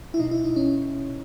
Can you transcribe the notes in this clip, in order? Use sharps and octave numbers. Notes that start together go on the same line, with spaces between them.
E4
B2 D#4
E4
D#4
C#4